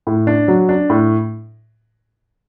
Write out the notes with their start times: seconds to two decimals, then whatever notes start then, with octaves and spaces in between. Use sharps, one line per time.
0.07 A2
0.27 D4
0.48 F#3
0.69 D4
0.90 A2